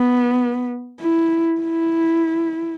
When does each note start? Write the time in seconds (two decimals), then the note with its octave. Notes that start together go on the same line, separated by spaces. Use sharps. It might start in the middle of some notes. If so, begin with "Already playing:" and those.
Already playing: B3
1.01 E4
1.61 E4